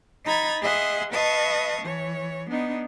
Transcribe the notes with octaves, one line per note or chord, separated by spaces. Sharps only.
D#4 A#5 B5 G#6 A6
G#4 D#5 E5 F#5 C6
B4 D#5 F5 A5 C#6 D#6
E3 C#5
B3 D4 D#4